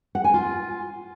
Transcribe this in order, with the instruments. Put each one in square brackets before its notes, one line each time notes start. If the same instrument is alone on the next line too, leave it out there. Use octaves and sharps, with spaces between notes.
[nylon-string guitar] F#5
G#5
F4